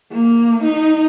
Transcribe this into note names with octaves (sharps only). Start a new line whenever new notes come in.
A#3
D#4